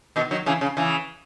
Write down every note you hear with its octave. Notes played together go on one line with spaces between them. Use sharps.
B2 D#3
D#3 F#3
C#3 E3
C#3
C#3 E3